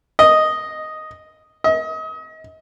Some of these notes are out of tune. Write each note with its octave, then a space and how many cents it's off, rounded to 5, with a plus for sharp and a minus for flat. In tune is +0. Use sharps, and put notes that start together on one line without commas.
D#5 +0
D#5 +35